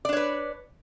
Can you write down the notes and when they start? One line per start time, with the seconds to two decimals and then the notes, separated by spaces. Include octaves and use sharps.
0.05 D5
0.09 D4
0.13 C#5
0.17 B4